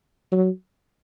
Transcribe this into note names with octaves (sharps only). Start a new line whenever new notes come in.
F#3